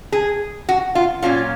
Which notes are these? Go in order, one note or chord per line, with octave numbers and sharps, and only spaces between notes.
G#4
F#4
F4
A#2 F#3 C#4 F4